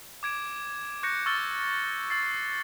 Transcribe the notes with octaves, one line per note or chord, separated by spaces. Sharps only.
D6 G#6 D7 E7
C#6 F#6 G6 A#6 C#7
C#6 E6 F6 A6 G7
E6 A6 C7